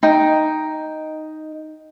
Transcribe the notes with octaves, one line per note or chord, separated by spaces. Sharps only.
D#4 G5